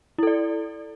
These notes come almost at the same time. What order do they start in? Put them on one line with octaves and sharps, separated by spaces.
E4 A4 D5